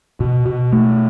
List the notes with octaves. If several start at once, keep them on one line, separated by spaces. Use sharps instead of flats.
B2
B2
A3